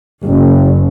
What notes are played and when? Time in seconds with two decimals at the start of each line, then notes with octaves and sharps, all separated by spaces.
0.25 F#1